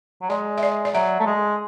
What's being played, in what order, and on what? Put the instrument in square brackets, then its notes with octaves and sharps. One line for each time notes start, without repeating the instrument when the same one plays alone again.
[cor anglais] F#3
[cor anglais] G#3 [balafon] D5
[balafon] E5
D5
D5
[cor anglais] F#3 [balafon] E5
[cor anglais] A3
G#3